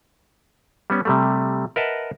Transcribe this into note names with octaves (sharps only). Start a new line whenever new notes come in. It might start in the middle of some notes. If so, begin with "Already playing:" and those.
G3 B3 C#4
C3 G3 A3
A#4 B4 D#5 E5 F#5 A5